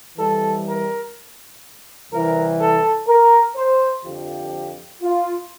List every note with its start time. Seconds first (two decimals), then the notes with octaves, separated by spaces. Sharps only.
0.18 F2 E3 G3 A4
0.67 A#4
2.11 C2 C3 E3 A#4
2.59 A4
3.07 A#4
3.56 C5
4.04 F2 D3 F3 G4
5.01 F4